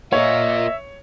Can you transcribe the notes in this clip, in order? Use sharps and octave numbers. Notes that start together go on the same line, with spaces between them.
A#3 F4 C#5 D#5 E5